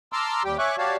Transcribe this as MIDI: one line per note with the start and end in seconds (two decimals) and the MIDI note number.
0.13 0.43 81
0.13 0.43 82
0.13 0.43 84
0.13 0.43 86
0.13 0.43 88
0.13 0.43 89
0.44 0.57 39
0.44 0.57 55
0.44 0.57 67
0.44 0.57 79
0.59 0.76 73
0.59 0.76 76
0.59 0.76 80
0.59 0.76 85
0.59 0.76 86
0.59 0.76 90
0.78 0.96 66
0.78 0.96 67
0.78 0.96 73
0.78 0.96 74
0.78 0.96 77
0.78 0.96 81